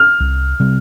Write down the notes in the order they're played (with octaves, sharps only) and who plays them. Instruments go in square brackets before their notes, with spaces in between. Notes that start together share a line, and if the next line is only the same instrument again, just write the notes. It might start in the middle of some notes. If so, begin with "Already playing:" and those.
Already playing: [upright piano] F6
[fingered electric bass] C2
C3 G3 C4